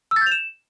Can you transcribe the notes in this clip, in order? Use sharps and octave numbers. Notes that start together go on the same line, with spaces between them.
E6
A6
G6
F7
E7